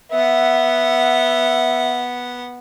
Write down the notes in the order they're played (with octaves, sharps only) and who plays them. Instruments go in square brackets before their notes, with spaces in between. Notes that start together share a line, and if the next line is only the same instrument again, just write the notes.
[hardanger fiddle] B3 F#5 [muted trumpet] E5